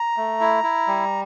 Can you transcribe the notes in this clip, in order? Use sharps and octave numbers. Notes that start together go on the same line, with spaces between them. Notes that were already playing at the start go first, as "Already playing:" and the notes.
Already playing: A#5
A3
E4
E4
G3